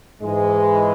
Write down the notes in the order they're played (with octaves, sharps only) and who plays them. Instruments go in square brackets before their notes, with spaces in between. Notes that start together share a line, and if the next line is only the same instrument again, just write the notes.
[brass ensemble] G#2 E3 G#3